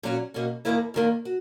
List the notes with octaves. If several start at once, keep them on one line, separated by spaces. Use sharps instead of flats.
A#2 F#3 C#4 F#4
B2 A#3 C#4 F#4
D#2 D#3 A#3 E4 B4
E2 D#3 A#3
F#4